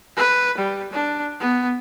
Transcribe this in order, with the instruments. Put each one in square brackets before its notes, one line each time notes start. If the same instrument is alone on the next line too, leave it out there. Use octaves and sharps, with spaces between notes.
[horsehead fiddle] B4
G3
D4
B3